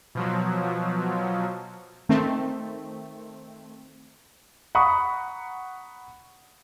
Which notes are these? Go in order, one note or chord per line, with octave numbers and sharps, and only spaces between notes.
B2 F3 F#3
D#3 A3 C4
F#5 A#5 B5 C#6 D#6